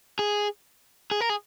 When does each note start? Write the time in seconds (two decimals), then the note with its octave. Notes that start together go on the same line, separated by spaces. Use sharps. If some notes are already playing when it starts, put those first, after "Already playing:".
0.19 G#4
1.11 G#4
1.20 A#4
1.29 G#4